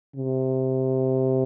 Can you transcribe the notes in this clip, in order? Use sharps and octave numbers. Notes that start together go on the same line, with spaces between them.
C3